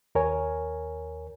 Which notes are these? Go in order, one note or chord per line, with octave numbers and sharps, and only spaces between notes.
D#2 A#4 C#5 G#5